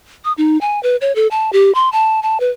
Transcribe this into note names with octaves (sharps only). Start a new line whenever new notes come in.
D#6
D#4
G#5
B4
C#5
A4
A5
G4
C6
A5
A5
B4